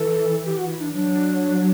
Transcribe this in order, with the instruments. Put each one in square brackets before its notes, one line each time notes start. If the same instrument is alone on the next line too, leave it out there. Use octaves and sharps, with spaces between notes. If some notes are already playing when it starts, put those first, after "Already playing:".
Already playing: [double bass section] E3 [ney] A4
[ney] G4
F#4
E4
D4
[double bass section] F#3 [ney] D4